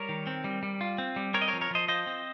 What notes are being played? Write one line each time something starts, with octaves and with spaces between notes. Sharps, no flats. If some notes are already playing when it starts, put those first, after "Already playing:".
Already playing: G3 A#4 C#5
D#3
C4
G3
G3
F4
C4
G3
C4 A#4 C#5
D#5
A#4 C#5
F3
A#4 C#5
F3 C5 D#5
F4 C5 D#5
C4